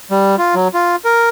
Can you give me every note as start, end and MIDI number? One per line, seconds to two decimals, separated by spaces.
0.11 0.36 55
0.38 0.55 65
0.55 0.68 54
0.74 0.96 65
1.05 1.29 70